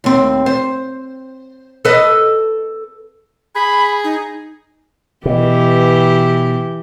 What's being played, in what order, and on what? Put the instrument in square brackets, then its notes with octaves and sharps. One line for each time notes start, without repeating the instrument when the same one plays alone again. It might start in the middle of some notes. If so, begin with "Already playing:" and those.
[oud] D#2 C4
C5
A4 B4 D#5
[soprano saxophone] G#4 [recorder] B5
[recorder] D#4
[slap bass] B2 [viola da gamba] E3 G4